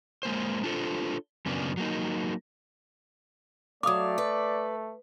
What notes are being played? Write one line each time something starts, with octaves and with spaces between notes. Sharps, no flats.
G#3 A#3 C5
D4 F4 A4 C5
F#2 C#3 A#3 B3 D4
F#3 A#3 D#4
F#3 A3 D5 F5 D6 D#6
B4